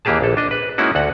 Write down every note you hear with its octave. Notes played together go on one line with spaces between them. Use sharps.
D#2 E3 A#3 G4 G#4 A5
A#1 A4
D4 D#5
B4
G#3 A#3 C#4 D#4 E4 F#4
D2 F#4 A4 F#5